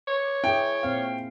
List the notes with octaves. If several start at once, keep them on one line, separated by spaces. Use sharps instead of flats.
C#5
E4 G#4 G5
A#2 C4 F5